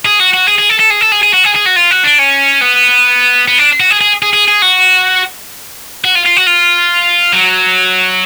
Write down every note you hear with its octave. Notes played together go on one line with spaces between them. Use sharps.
G#4
F#4
F#4
G#4
G#4
A4
A4
G#4
A4
G#4
G#4
F#4
G#4
G#4
F#4
F4
F#4
D4
C#4
B3
B3
D4
F#4
G#4
G#4
G#4
G#4
G#4
F#4
F#4
F4
F4
F#4
F4
F#3